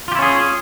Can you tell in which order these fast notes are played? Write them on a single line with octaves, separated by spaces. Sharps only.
F4 G4 E4 C#4 G#4